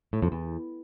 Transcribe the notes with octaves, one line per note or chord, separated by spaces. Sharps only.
A2
F2
E2